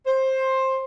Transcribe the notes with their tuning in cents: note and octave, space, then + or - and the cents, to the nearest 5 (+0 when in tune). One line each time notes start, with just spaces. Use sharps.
C5 +15